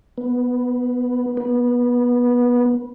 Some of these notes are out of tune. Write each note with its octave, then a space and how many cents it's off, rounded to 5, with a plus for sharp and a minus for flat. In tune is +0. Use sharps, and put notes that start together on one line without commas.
B3 +0
B3 -20